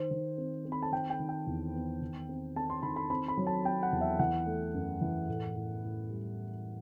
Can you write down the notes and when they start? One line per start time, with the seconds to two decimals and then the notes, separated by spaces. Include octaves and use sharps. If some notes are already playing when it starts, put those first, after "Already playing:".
Already playing: D#3 C5
0.11 D#3
0.38 C4
0.65 C4
0.72 B5
0.82 A5
0.92 D#3 G5
1.10 G5
1.19 D#3
1.29 G5
1.47 E2
1.74 B3
2.01 D#3
2.29 C4
2.56 C4 A5
2.70 C6
2.82 D#3 B5
2.96 B5
3.10 C4 B5
3.28 B5
3.37 F#3
3.47 A5
3.65 C4 G5
3.83 F#5
3.92 E2
4.01 E5
4.19 E3 F#5
4.46 A3
4.74 F#2
5.01 E3
5.29 A2
5.56 A2
5.83 A2
6.10 G3